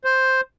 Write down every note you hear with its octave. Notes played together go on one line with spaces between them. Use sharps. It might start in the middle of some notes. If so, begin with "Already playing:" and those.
C5